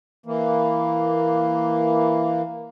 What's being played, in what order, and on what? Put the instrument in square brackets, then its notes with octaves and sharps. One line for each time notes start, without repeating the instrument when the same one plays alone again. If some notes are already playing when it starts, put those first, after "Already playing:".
[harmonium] E3 A#3